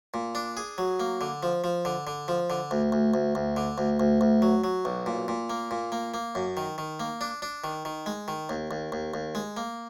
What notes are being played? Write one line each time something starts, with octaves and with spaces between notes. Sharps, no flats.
A#2
D4
G#4
F#3
A#3
D3
F3
F3
D3
D3
F3
D3
D2
D2
D2
D2
D3
D2
D2
D2
F#3
F#3
B1
A#2
A#2
A#3
A#2
A#3
A#3
F#2
D#3
D#3
A#3
D4
D4
D#3
D#3
G#3
D#3
D#2
D#2
D#2
D#2
G#3
A#3